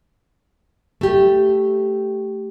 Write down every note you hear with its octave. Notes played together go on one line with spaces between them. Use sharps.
A3 G4